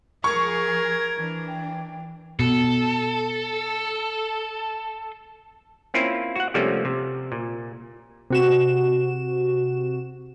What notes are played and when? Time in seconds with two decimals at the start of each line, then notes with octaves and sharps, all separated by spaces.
0.24 F3 G#4 A#4 C#6 G#6
1.16 E3 D4
1.47 G5
2.40 B2 A4
5.94 A#3 C4 C#4 E4 F4
6.36 F#4 F#5
6.54 C3 F3 G3 A3 A#3 C#4
6.85 C3
7.32 A#2
8.30 C3 F#4 E7